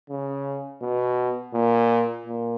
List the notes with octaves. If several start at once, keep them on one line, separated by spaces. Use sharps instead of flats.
C#3
B2
A#2
A#2